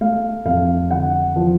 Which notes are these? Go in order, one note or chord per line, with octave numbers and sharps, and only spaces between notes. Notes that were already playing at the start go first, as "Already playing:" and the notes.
A3 F5
F2 F5
D3 F#5
F3